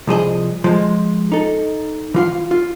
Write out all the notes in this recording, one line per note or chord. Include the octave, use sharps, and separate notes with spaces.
C2 F3 G#4 D#5
F3 G#3
D#4 A4
E3 F4 F5
F4